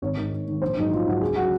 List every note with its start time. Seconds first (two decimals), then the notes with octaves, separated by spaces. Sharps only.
0.02 G#1 C#5
0.17 G#2 D#3
0.32 G#1
0.47 G#2 D#3
0.62 A#1 C5
0.77 G#2 F#3 D#4
0.91 A#1 F4
1.07 G#2 F#3 F#4
1.21 C#2 G#4
1.36 C#3 F#3 F#4